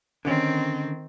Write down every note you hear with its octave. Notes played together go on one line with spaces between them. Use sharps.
D3 D#3 C4 C#4